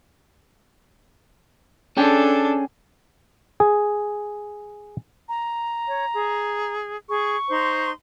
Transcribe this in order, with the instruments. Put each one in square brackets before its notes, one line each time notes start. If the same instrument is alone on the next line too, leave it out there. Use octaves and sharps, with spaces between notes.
[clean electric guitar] C#4 G#4 G5 [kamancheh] D4 A4
[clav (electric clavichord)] G#4
[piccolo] A#5
[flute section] C#5
G#4
[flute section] G#4 [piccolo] C#6
[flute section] D#4 C5 C6